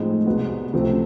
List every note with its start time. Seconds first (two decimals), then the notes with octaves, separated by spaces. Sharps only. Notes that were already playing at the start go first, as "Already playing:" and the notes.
Already playing: A2 F3 G#3 C4 D#4
0.27 C2 B2 G#3 B3
0.73 C#2 C3 F3 A3 C4